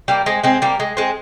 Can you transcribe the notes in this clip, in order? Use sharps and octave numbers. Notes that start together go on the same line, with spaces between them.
G3 A#3
G#3 C4
G#3 C4
G3 A#3
G#3
G#3 C4